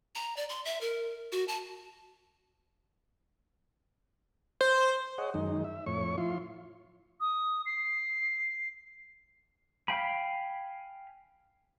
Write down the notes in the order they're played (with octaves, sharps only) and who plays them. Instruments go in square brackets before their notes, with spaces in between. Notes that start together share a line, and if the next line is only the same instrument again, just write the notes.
[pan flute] A#5
D5
C6
E5
A#4
F#4
A5
[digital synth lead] C5
[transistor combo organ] G#4 C#5 D#5 F#5
F#2 D#3 G#3 D#4
E5
F2 A2 C#5 C#6
F3 E4 F4 C6
[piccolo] D#6
C7
[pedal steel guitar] F5 G5 G#5 B5